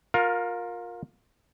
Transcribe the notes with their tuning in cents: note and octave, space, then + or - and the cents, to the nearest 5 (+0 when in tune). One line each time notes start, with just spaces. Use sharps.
F4 +25 A#4 +0 F5 +25